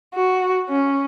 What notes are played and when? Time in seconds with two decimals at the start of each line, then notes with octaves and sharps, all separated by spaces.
0.14 F#4
0.69 C#4